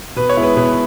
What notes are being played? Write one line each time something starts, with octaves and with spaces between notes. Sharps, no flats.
B2 B4
C#5
G#3 B3 E4
B4
B2 B4